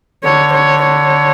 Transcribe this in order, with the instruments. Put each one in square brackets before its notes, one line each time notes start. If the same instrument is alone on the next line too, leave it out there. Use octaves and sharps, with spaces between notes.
[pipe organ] D3 [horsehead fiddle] C#5
[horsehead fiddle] C#5
C#5